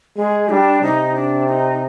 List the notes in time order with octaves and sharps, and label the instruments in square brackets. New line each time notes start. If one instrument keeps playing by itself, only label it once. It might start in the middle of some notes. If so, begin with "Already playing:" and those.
[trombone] G#3 [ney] G#4
[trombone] G3 [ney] D4
[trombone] C3 [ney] D#4
[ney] D4
D#4